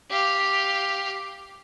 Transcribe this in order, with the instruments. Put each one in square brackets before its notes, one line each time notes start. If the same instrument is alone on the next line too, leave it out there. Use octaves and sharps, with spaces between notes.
[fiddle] G4 F5